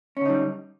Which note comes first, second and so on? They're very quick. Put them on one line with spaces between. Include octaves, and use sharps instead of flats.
C#4 D3 D#4 G3